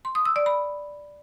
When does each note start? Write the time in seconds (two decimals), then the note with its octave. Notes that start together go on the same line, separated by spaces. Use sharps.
0.05 C6
0.15 D#6
0.25 E6
0.36 D5
0.46 B5